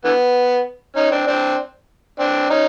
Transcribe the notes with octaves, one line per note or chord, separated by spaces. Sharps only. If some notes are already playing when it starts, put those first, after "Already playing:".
D3 E3 B3
C#4 D#4
C4 D4
C4 D4
C4 D4
C#4 D#4